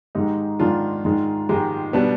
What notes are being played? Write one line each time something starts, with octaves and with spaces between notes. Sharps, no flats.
G#2 D#3 G#3 D#4 G4
G#2 D#3 G#3 D4 F4
G#2 D#3 G#3
G#2 D#3 G#3 D#4 G4
B2 G3 B3 D4